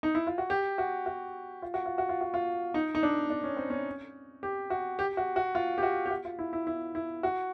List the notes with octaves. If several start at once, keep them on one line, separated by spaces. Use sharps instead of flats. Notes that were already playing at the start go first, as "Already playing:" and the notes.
D#4
E4
F4
F#4
G4
F#4
F#4
F4
F#4
F4
F#4
F4
F#4
F4
D#4
D#4
D4
D4
C#4
C4
C#4
G4
F#4
G4
F#4
F#4
F4
G4
F#4
G4
F#4
F4
E4
E4
E4
E4
F#4